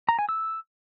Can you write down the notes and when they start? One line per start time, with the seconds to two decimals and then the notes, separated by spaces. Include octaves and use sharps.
0.09 A#5
0.19 G#5
0.29 E6